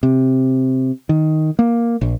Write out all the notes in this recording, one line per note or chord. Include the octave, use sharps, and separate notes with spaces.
C3
D#3
A#3
A#1